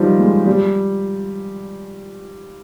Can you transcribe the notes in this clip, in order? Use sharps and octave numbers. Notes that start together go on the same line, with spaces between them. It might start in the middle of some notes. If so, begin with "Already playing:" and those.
Already playing: D#3 F3 G3
G#3
G3